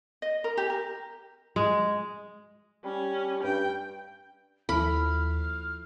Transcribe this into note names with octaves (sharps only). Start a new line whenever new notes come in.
D#5
A#4
G4
A#4
G#3
G3 C#4
G2 G5
D#2 F3 E4 A4 B5 F6